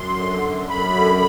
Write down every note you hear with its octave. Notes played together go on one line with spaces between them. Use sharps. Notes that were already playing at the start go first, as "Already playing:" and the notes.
Already playing: F#2 C6
D3
F#2
F#2 B5
D3